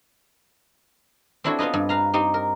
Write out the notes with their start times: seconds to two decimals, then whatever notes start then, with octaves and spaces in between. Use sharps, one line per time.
1.44 C4 D4 E4 F#4 A4 C#5
1.59 B3 C4 F4 B4 D#5
1.74 G2
1.89 B4 F5 A#5
2.14 C4 D#4 G4
2.34 A#4